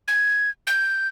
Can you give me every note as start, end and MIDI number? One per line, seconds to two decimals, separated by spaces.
0.08 0.50 92
0.67 1.08 91